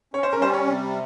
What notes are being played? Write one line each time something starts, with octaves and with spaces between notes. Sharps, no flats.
C#4 C#5
C5
A#4
G3 C5
C#5
C3